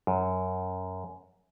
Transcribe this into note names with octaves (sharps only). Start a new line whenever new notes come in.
F#2